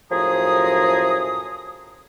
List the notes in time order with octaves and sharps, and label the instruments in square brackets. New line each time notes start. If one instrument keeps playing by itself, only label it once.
[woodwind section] F#2 A2 F3 G#4 A#5 D#6